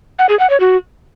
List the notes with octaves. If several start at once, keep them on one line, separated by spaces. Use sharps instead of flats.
F#5
G#4
F#5
C#5
F#4